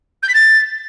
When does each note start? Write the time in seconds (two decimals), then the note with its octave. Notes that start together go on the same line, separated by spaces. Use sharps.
0.23 G6
0.28 B6
0.34 A6